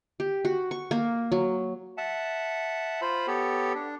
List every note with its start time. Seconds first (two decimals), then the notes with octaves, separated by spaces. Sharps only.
0.20 G4
0.45 F#4
0.71 C#6
0.91 A#3
1.32 F#3
1.98 E5 F#5 A5
3.02 F4 C5 B5
3.27 B3 G4 A4 C#5
3.75 D4